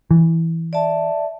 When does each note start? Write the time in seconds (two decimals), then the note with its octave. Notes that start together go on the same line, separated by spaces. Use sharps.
0.11 E3
0.73 D5 E5 A5